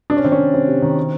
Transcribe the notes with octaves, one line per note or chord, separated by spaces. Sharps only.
C3 D4
C#4
D#3 C4
C#4
D#3
C3 C4
C3
D#3
B2